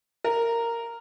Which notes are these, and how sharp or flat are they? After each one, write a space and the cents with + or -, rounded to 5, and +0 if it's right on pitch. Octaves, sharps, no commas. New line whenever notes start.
A#4 -10